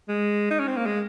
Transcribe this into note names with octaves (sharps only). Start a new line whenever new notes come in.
G#3
D#4
C#4
C4
A#3
G#3